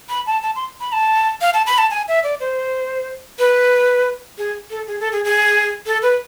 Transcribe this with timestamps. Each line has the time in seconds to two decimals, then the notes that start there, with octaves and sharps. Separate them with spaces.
0.09 B5
0.26 A5
0.42 A5
0.55 C6
0.80 B5
0.92 A5
1.41 F5
1.54 A5
1.66 B5
1.78 A5
1.91 G#5
2.08 E5
2.23 D5
2.40 C5
3.39 B4
4.38 G#4
4.70 A4
4.87 G#4
5.00 A4
5.12 G#4
5.24 G#4
5.86 A4
6.02 B4